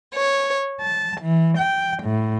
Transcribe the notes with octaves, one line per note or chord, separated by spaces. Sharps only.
C#5
A5
E3
G5
A2